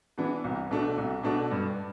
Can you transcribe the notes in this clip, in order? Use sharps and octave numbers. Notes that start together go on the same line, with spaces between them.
E3 B3 D4
C2
B2 A3 D4
C2
B2 A3 D4
G2